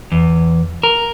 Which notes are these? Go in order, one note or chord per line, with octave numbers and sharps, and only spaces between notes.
E2
A#4